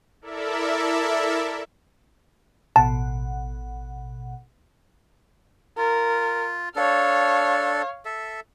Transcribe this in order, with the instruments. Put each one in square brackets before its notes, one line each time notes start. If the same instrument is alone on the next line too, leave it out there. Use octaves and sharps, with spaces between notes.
[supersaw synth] E4 A4 A#4 D5 E5
[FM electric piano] A1 B2 F#5 [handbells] A5
[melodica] F4 [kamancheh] A#4
[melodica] D4 A4 [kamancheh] C#5 F5
[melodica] A4 E5